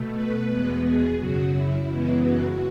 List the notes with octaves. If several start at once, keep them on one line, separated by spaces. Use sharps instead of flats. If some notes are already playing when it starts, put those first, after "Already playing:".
Already playing: B2 A3
B4
E2 B2 G#3 B3
G#4
F#2 C#3 F#3 F#4
E4
F#2 C#3 E3 G#3 B3
F#4